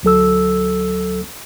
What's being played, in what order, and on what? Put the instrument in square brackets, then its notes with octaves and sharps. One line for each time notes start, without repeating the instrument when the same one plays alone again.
[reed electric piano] D2 F#3 A4 E6